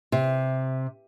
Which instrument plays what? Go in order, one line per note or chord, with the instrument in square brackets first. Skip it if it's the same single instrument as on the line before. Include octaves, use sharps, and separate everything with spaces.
[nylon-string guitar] C3